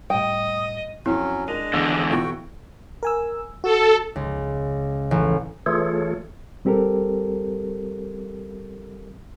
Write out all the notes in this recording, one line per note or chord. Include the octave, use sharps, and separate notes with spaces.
A2 G3 D#5 G5 D#6
F2 F#3 C#4 E4
G#3 D4 A#4 D#5 D#7 F7
E2 D3 E6
B1 E3 F#4 G5 C#6
A#4 G#5 E6
F#4 A4
C#2
A1
E3 A3 F4 G#4 A4 C#5
G3 C4 G4 A4 A#4